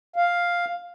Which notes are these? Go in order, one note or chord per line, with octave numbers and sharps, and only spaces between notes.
F5